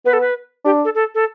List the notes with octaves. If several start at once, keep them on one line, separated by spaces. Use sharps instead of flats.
B3 B4
A4
B4
D4 G4
A4
A4
A4